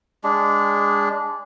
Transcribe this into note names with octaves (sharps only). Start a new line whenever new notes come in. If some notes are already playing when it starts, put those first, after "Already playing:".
G#3 D4